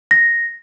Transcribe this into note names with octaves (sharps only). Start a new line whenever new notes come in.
A#6